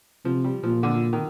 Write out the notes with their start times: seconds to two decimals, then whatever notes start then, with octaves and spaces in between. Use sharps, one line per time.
0.25 C3 F3
0.44 G3
0.63 A#2 F3
0.83 D3
1.13 D#3